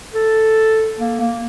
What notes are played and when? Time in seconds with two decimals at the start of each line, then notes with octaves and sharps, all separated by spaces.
0.13 A4
0.99 A#3
1.20 A#3